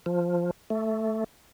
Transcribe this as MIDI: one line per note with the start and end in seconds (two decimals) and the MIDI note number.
0.06 0.51 53
0.70 1.24 57